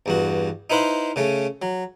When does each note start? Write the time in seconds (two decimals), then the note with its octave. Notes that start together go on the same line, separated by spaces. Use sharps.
0.06 E2 G2 F#4
0.70 D#4 E4 B4 C5 F5
1.16 C#3 A3 C#4
1.62 F#3